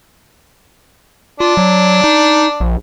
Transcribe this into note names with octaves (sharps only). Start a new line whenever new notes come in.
D4 F4
F#3
D#4
A#1